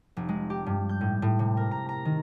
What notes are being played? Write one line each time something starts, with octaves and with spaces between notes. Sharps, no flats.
F1
G#3
G4
G2
G6
A2
A2
C3
A#4
A#5
A#5
D#3